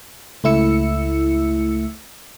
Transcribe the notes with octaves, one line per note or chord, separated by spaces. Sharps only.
C#2 A3 E4 E6 C#7